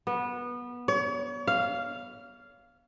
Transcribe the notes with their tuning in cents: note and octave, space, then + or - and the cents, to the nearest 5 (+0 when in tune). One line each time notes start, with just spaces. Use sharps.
B3 -20
C#5 +40
F5 -5